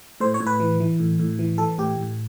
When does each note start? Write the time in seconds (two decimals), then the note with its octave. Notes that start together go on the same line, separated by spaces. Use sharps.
0.20 A2 C5
0.34 C#5
0.40 A2
0.47 B4
0.60 E3
0.80 E3
1.00 A2
1.19 A2
1.39 E3
1.58 E3 A4
1.78 A2 G4
1.97 A2